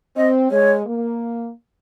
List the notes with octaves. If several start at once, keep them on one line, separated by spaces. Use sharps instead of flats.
C4 D#5
G#3 C#5
A#3